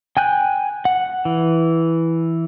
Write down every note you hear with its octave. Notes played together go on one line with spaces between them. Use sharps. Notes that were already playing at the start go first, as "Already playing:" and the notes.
G5 G#5 F#6 G6
F#5
E3